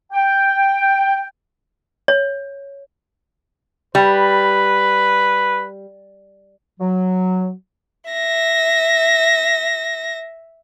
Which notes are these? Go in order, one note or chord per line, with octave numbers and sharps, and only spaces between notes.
G5
C#5
G3 B4
F#3
E5 A#6